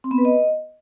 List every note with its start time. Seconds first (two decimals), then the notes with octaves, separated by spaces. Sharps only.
0.04 C4
0.11 B3
0.18 B4
0.25 D#5